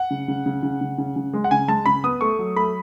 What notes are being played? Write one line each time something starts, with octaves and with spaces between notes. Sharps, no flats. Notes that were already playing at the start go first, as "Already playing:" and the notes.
Already playing: F#5
C#3
C#3
C#3
C#3
C#3
C#3
C#3
G#3
F#5
C#3 G#5
G#3 A5
C#3 B5
B3 D#6
A3 C#6
F#3
A3 B5